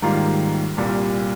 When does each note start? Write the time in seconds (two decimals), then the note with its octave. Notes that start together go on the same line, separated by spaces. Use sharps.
0.02 G#2 D#3 G3 A#3 F4
0.77 C2 A#2 G3